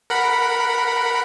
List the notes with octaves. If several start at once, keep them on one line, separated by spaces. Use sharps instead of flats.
A#4 F#5 B5